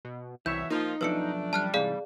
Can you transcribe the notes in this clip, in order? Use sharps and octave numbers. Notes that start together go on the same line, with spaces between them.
B2
C2 B2 E3 C#5 E5 G6
F3 A#3 D#4 F4
F#2 B2 F3 A3 D4 B4 E6 C#7
G3 A5 F6 F#6
G#2 C3 E3 G#4 D5 F5